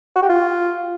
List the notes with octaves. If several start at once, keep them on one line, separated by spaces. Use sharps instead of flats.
F#4
G4
F4